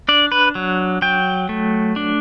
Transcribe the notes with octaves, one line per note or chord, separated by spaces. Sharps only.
D4 D5
B4
F#3
F#3 G5
A3
D4